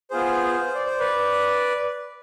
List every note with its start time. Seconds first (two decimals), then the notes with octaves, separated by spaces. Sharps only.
0.11 B3 F4 G#4 C5
0.75 D5
0.87 C5
1.00 B4 D5